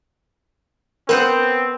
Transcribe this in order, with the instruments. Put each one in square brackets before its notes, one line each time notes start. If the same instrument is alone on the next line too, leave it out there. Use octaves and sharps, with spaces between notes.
[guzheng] B3 C5 F#5 [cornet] C4 [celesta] A#4